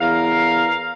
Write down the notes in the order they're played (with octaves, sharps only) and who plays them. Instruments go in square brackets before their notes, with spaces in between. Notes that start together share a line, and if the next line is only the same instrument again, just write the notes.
[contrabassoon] E2 [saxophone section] A#4 F5